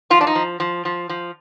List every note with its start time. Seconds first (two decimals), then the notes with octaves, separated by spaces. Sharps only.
0.10 F3 F4
0.21 D4
0.27 D#4
0.35 F3
0.60 F3
0.85 F3
1.09 F3